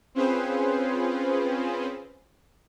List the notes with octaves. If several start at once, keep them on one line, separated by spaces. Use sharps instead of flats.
C4 C#4 F4 G#4 B4 C5